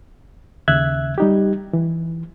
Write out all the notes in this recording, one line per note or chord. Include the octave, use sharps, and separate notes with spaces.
D#2 C#3 E5 F#6 G#6
G3 D#4 G4
E3